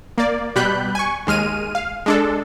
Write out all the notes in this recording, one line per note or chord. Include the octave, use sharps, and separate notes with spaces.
A#3 D5
B2 G3 B5 F#6 G6
G#5 C#6
D#2 G#3 F6 D#7
F5
G#3 D4 A4